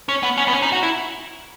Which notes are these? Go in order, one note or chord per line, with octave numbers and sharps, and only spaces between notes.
C#4
B3
C#4
B3
C#4
D#4
F#4
E4